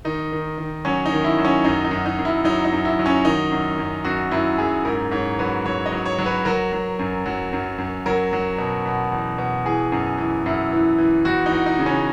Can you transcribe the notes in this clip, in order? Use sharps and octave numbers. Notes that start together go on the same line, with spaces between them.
D#3 D#4
D#3
D#3
F#3 C#4
D#4
D#3
E4
F#3
C#4
F#2 D#4
D#4
F#2
D#4
F#2
E4
F#3 D#4
D#4
F#2
E4
F#3
C#4
D#3 D#4
F#2
F#2
F#2 F#4
F#2 E4
F#2 G#4
G#2 A#4
G#2 C#5
F#3 B4
F#3 C#5
D#5
F#3
C#5
F#3
B4
F#3 A#4
F#3
F#2
F#3
F#2
F#2
F#3 A#4
F#3
B2
B2
E2
B2
E3 G#4
F#2
E3
F#2 E4
E3
E3
E2 F#4
D#4
E2
D#4
C#3
C#4